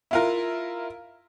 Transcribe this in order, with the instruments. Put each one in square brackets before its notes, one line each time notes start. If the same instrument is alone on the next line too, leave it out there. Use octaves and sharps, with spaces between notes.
[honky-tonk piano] E4 F4 A#4